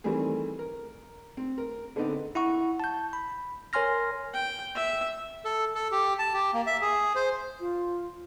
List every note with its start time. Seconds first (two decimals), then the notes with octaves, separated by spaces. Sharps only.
0.04 D#3 E3 G3 A3 C4 G#4
0.59 A#4
1.37 C4
1.58 A#4
1.96 D3 A3 B3 C4 D#4 D5
2.35 E4 F#5 C#6
2.80 A5 G6
3.13 B5
3.73 A#4 C#5 G#5 C6 F6 A#6
4.33 G5
4.75 E5
5.45 A4
5.75 A4
5.92 G4
6.19 A5
6.34 G4
6.54 A#3
6.67 E5
6.81 G#4
7.15 C5
7.60 F4